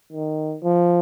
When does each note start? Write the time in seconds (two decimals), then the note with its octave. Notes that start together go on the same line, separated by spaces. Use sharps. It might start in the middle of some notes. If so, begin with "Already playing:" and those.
0.13 D#3
0.63 F3